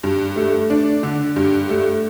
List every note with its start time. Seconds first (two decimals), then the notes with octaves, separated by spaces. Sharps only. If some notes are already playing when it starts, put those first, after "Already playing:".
0.04 G2
0.36 A3
0.70 D4
1.03 D3
1.36 G2
1.69 A3